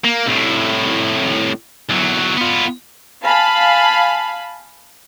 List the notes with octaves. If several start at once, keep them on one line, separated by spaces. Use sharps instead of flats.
A#3
C2 A2
E2 F#3
B3 F4
F5 G#5 A5 B5